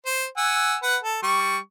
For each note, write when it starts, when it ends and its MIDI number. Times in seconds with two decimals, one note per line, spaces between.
0.06 0.26 72
0.37 0.76 78
0.37 0.76 80
0.37 0.76 88
0.82 0.97 71
0.82 0.97 78
1.03 1.19 69
1.23 1.58 55
1.23 1.58 85